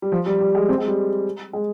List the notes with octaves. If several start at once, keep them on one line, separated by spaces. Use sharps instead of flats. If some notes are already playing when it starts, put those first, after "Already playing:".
G3
F3
G3
G3
G#3
C4
G#3
G3
G#3